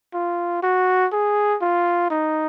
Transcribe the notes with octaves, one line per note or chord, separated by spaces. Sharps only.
F4
F#4
G#4
F4
D#4